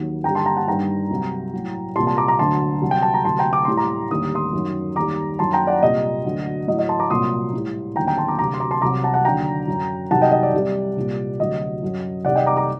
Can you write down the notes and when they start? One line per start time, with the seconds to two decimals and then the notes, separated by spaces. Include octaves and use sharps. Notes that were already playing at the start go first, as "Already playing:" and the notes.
Already playing: D#2 D#3 F#3
0.24 G2 D3 G3 G5 A#5
0.35 A5 C6
0.46 G5 A#5
0.56 F#5 A5
0.67 G2 D#3 G3 G5 A#5
1.10 C2 C3 F#3
1.53 A2 F#3
1.96 C2 A#2 G3 A5 C6
2.07 A5 C6
2.17 A#5 D6
2.28 A#5 D6
2.39 D2 D3 F#3 A5 C6
2.81 C2 C3 F#3
2.91 G5
3.02 A5
3.14 A#5
3.24 D2 C3 F#3 A5 C6
3.39 G5 A#5
3.53 D6
3.65 A2 G3 C6
3.77 A#5 D6
4.11 D#2 D3 G3 D#6
4.35 C6 D#6
4.53 F#2 D#3 F#3
4.96 D#2 D#3 G3 A#5 D6
5.39 F#2 D#3 F#3 A5 C6
5.53 G5 A#5
5.67 D5 F#5
5.82 C2 A#2 G3 D#5
6.24 D2 D3 F#3
6.67 A2 F#3 D#5
6.79 D#5
6.89 A5 C6
6.99 A#5 D6
7.10 C2 A#2 F#3 C6 D#6
7.53 A2 G3
7.96 D#2 D3 F#3 G5 A#5
8.07 G5 A#5
8.18 A5 C6
8.28 A#5 D6
8.39 D2 C3 F#3 A#5 D6
8.54 C6
8.60 A#5 D6
8.71 A5 C6
8.82 C2 C3 F#3 A#5 D6
9.04 F#5 A5
9.14 F#5 A5
9.25 D#2 D3 F#3 G5 A#5
9.68 F#2
9.73 F#3
10.11 C2 C3 D#3 F#3 F#5 A5
10.22 D#5 G5
10.32 D#5
10.43 D5
10.54 C2 C3 G3
10.97 C2 A#2 G3
11.40 D2 C3 F#3 D#5
11.83 F#2 F#3
12.25 C2 C3 D#3 D5 F#5
12.36 D#5 G5
12.46 A#5 D6
12.57 A#5 D6